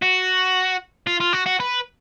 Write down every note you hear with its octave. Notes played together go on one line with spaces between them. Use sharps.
F#4
F4
F4
F#4
F#4
B4